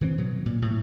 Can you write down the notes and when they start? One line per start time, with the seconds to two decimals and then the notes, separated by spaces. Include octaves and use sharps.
0.01 D#3 E3 A3 C4
0.18 B2 F#3
0.46 A#2
0.62 A2